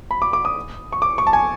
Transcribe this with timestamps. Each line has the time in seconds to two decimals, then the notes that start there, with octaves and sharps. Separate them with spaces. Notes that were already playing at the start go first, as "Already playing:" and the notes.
0.11 B5
0.22 D6
0.33 D6
0.45 D#6
0.92 C#6
1.02 D6
1.18 C#6
1.27 A5
1.33 G#5